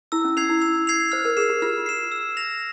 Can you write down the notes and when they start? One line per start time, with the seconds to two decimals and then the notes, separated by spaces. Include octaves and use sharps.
0.12 E4 E6
0.25 C#4
0.37 C#4 G#6 C7 F7
0.50 E4
0.62 E6
0.87 G#6 C7 F7
1.12 C5 F6
1.25 A#4
1.37 G#4 C7 E7
1.50 G4
1.62 F4 F6
1.86 C7 E7
2.12 E6
2.37 A#6 F7